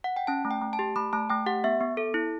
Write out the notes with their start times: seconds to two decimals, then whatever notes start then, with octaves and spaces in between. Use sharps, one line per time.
0.04 F#5
0.16 G5
0.27 C#4 A5
0.45 A3
0.51 G5
0.62 A3
0.73 A5
0.79 G4
0.96 A3 B5
1.13 A3 A5
1.30 A3 G5
1.46 G4 F#5
1.64 B3 E5
1.80 B3
1.97 A4
2.14 E4